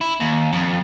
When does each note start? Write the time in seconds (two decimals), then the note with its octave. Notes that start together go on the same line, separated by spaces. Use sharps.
0.01 E4
0.21 D#2
0.53 F2